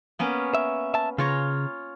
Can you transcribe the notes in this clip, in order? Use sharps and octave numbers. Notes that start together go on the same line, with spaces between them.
A#3 B3 C#4
E5
E5 A5
C#3 F4 C#5 A#5